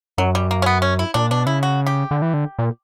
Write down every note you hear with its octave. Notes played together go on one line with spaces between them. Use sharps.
F#2 F#3
G3
A#3
C#4
B3
C#4
E4
A#2 D4
B2 D4
C#3 E4
F#4
G4
D3
E3
D3
A#2